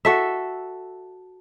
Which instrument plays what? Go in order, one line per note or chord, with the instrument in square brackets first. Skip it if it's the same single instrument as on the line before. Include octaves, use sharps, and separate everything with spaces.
[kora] F#4 A4 E5